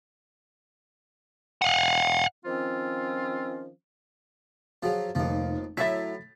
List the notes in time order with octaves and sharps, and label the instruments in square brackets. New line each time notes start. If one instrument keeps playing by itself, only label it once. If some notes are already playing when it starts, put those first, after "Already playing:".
[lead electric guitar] F5 F#5
[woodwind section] D#3 F3 C4 C#4 F4
[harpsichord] F3 F#3 [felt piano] F#4 G#4 F5
[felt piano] F1 [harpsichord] D#2 F3
[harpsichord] A2 F#3 A#5 [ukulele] E4 E5 [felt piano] A6 B6